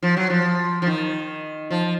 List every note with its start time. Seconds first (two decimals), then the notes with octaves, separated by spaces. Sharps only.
0.03 F3
0.17 F#3
0.30 F3
0.82 F3
0.87 D#3
1.71 F3